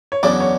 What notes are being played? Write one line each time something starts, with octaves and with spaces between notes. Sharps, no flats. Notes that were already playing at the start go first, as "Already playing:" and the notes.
C#5
E2 C#3 F#3 B3 D4 D5
C#5